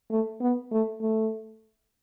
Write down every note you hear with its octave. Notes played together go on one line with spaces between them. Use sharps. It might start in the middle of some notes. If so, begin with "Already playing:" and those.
A3
B3
A3
A3